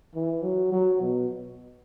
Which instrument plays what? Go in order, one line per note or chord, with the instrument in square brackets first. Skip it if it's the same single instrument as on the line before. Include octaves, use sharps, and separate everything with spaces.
[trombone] E3
F#3
F#3
B2